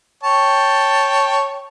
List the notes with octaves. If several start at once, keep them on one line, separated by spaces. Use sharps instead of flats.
C#5 G5 A5